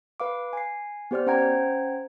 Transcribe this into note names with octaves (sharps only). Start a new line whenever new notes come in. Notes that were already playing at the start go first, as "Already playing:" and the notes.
B4 F5 D6
G#5 C7
B3 G4 C5 D5 F6
C#4 C5 F#5 G5 A#5 G#6